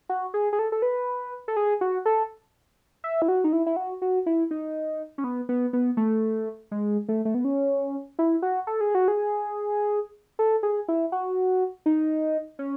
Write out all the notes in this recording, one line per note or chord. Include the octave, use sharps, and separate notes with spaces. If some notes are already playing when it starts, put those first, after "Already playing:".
F#4
G#4
G#4
A4
A4
B4
A4
G#4
F#4
A4
E5
E4
F#4
D#4
E4
E4
F#4
F#4
E4
D#4
C#4
B3
B3
B3
A3
G#3
A3
A3
B3
C#4
E4
F#4
A4
G#4
F#4
G#4
A4
G#4
E4
F#4
D#4
C#4